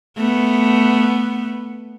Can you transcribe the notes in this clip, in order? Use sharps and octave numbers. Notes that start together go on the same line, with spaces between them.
A3 B3